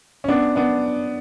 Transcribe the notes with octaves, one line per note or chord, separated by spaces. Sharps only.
C#4
B3 D4
B3 D4